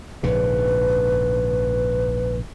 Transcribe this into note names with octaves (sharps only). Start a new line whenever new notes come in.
A#1 G#2 C#3 B4